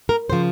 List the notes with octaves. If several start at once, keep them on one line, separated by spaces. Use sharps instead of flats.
A#4
C#3 F3 C5